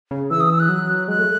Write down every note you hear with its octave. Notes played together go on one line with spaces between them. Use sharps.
C#3
E3 E6
D#6
E6
F#6
F#3
G#3 F#6
A3